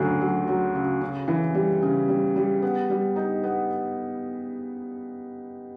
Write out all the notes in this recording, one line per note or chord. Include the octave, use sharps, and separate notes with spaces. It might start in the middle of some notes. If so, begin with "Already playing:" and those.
Already playing: D2 C#3 F#3
F#3
F#3
C#3
C#3
E3
G3
C#3
G3
G3
B3
G3
D#4
B3